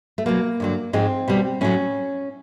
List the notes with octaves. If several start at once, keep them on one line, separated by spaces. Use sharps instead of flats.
A3
B2 F#3 A#3
G2 D3 F#3
G#2 F3 G#3 C4
B2 G3
A2 F#3 C#4